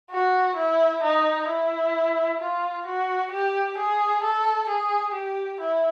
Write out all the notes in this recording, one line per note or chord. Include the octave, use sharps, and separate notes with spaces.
F#4
E4
D#4
E4
F4
F#4
G4
G#4
A4
G#4
G4
E4